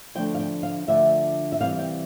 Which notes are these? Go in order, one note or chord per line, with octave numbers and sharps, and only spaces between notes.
D3 F3 A3 D4 G5
F5
G5
F5
D3 F3 A3 D4 E5
E5
C3 E3 G3 C4 F5
G5